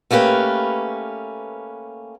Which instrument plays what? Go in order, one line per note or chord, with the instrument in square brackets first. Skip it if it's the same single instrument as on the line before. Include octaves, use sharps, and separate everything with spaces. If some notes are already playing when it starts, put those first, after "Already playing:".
[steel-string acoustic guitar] A3 A#3 C#4 G4 B4